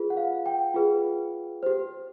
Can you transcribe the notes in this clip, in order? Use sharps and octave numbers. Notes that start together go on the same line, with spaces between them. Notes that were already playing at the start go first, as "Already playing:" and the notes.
Already playing: F4 G#4 B4
F#5
F5
G5
F4 G#4 B4
G4 C5